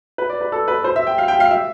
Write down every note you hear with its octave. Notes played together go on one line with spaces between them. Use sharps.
B4
D5
B4
A4
B4
C5
E5
G5
F5
G5
F5
E5